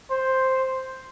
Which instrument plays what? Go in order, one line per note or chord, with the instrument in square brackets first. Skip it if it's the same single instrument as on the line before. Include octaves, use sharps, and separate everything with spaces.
[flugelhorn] C5